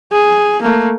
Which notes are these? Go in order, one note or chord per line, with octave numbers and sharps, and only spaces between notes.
G#4
A3 A#3